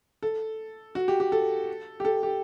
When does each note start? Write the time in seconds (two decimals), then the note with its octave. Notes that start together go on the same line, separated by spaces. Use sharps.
0.23 A4
0.95 F#4
1.08 G4
1.20 G4
1.32 A4
2.00 G4
2.05 A4
2.23 G4